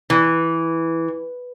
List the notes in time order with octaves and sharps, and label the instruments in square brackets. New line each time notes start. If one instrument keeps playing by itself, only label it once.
[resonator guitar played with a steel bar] E3